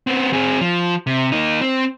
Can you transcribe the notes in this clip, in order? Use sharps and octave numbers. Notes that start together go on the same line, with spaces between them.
B3 C4
C4 G#4
F3
C3
A#3 D#4
C4